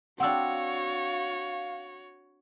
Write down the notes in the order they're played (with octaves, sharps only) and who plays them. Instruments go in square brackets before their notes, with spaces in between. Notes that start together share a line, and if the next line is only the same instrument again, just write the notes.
[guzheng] C4 D4 [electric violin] F#4 C#5 [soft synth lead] F5 [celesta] F#5 E6